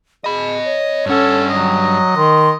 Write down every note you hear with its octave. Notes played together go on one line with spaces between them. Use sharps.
G#4 D#5 B5
C#5
G2 C#4 A4 F#5
F#3 D#5
D#3 C6